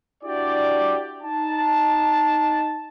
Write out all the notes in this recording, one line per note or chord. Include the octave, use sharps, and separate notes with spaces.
D4 E4 F#4 G4 D5
D#4 A5